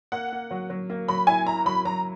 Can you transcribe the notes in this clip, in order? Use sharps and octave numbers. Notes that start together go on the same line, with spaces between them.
A#3 F#5
A#3
F#3
F#3
A#3
F#3 B5
E4 G#5
E4 A#5
F#3 B5
F#3 A#5